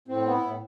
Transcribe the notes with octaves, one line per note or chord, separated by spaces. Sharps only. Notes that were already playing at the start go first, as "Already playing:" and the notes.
A2 C4
B3
E4
A2